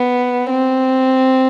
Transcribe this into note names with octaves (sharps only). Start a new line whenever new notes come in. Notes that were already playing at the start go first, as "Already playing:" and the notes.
Already playing: B3
C4